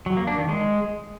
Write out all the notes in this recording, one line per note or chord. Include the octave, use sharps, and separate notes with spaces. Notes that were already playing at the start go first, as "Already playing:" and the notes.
F#3
A#3
D4
D#3
G#3